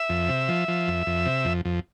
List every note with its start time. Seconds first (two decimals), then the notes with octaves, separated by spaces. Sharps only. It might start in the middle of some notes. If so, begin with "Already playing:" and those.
Already playing: E5
0.09 F2
0.29 C3
0.48 F3
0.68 F3
0.88 F2
1.07 F2
1.26 C3
1.45 F2
1.65 F2